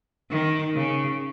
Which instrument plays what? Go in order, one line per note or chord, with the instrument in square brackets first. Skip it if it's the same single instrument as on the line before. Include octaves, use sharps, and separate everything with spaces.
[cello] D#3
C#3